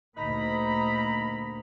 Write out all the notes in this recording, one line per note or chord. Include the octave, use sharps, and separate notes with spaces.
D2 A#2 D#4 A#5 B5